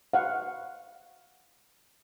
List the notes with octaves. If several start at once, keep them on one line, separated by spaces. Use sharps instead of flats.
F5 F#5